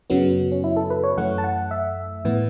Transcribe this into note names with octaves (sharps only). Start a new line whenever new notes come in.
F#2 C#3 F#3 B3
C#4
E4
A4
B4
C#5
F#2 E3 A3 F#5
A5
F#5
E5
A2 E3 B3